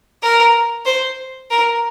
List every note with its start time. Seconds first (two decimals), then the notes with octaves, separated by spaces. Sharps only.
0.22 A#4
0.85 C5
1.50 A#4